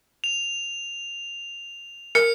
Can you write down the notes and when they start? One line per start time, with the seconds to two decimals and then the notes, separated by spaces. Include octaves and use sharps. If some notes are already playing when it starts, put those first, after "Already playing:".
0.24 F7
2.15 A#4 C#7